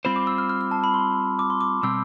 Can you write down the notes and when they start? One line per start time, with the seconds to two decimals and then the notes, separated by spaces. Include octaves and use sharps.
0.05 G3 C4 F4 C5 B5
0.16 D6
0.27 E6
0.38 F6
0.49 F6
0.61 F6
0.71 A5
0.84 B5
0.94 C6
1.39 D6
1.50 C6
1.61 D6
1.83 B2 G3 C4 E6